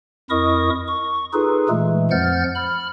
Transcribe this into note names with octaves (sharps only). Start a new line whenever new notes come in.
F2 E4 A#4 D#5 C#6 D#6
C#6
D#4 F4 G#4 A4 B4
A#2 E3 G#3 A3
F2 F3 F#5 F6 G6 A6
B5 F6